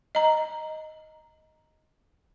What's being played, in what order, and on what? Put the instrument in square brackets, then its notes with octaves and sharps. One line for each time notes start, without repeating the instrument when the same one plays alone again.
[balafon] D#5 A#5